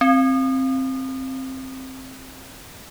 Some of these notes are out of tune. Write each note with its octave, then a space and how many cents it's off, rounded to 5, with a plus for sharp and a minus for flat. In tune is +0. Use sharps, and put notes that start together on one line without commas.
C4 +10